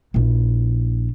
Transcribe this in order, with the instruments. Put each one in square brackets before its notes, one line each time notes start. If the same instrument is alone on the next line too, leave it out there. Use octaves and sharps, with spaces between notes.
[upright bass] A#1 E4